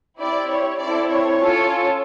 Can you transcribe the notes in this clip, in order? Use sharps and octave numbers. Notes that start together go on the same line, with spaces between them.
C4 E4 G4 D5
C#5
C4 E4 A4 D5
C#5
C#4 F4 A4